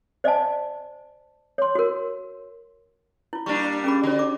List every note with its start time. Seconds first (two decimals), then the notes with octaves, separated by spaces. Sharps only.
0.24 C5 D5 D#5 F5 G#5 A5
1.58 C#5 C6
1.75 F#4 A#4
3.33 E4 F4
3.46 G3 A#3 D4 C#6
3.84 C#4 G#4 B5
4.04 D3 F#4 C#5
4.19 D6